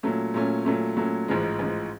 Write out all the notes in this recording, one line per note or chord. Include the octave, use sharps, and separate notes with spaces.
A#2 F#3 A3 C#4
A#2 F#3 A3 C#4
A#2 F#3 A3 C#4
A#2 F#3 A3 C#4
A1 G#2 F3 G#3
A1 G#2 F3 G#3